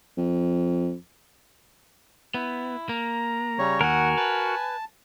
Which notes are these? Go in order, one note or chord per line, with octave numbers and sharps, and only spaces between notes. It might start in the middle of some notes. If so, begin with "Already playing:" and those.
F2
B3 E4
A#3 A#5
C#3 G3 C#5
D#2 F#4 A#4 F#5 G#5
B4 A5